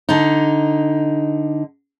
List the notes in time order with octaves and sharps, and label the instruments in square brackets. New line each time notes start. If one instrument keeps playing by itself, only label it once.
[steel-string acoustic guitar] D3 D#4